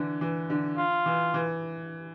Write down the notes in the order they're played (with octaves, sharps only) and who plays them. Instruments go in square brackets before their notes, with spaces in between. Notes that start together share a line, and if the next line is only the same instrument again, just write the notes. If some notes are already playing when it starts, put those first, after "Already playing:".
Already playing: [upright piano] D3 E3
E3
D3
[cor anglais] F4
[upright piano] E3
E3